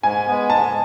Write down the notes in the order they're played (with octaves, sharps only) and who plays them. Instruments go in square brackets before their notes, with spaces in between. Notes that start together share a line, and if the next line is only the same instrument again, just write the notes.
[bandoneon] G#2 [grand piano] G#5
[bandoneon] G#3 B3
[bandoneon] G#2 [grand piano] A5